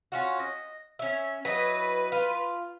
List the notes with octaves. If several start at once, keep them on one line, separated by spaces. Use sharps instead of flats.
C#4 F4 F#4
D#5
C#4 E5
F#3 E4 B4 D#5
F4